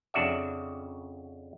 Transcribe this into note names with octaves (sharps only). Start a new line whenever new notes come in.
F2 C#3 D4 F#4 D5 E5